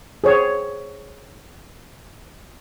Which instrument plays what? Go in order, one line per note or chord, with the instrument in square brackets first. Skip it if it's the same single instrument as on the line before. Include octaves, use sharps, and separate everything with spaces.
[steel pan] G#4 C5 C#5